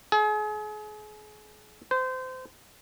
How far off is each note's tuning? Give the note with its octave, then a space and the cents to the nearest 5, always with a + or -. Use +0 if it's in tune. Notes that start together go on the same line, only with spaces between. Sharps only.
G#4 +35
C5 -25